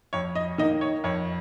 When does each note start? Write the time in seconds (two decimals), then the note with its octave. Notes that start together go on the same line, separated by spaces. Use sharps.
0.13 F2 C#5
0.35 D#5
0.58 D#3 A#3 D#5
0.81 C#5
1.04 F2 C#5